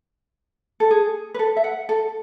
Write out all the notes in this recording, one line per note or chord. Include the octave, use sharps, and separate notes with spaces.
A4
G#4
B4
A4
E5
F#5
A4